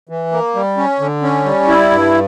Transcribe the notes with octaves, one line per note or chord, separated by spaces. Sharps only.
E3
A#3
G3
C#4
D3
C#4
G3
E4
G2